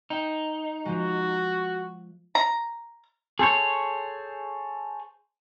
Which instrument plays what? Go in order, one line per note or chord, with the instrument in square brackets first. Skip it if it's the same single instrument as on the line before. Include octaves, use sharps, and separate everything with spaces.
[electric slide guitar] D#4 [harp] G5 E7
[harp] F3 G#3 [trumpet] F#4
[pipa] A#5
[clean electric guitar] G#4 A4 C5 C#5